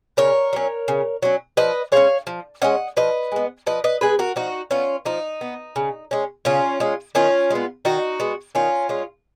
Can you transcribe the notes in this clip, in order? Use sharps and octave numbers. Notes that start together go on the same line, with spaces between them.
C#3 A#4 C#5
F#3 C#4
C#3
F#3 C#4
F3 B4 D#5
G#3 C#4 C#5 F5
F3
G#3 C#4 D#5 F#5
F3 B4 D#5
G#3 B3
F3 B4 D#5
B4 D#5
G#3 B3 G#4 B4
F#4 A#4
F3 D#4 F#4
B3 C#4 F4
F3 D#4
B3
C#3
G#3 C#4
C#3 C#4 F4
G#3 C#4
D#3 C#4 F4
G#3 B3
D#3 D#4 F#4
G#3 B3
D#3 C#4 F4
G#3 C#4